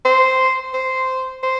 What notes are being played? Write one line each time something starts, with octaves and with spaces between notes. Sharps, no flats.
C5
C5
C5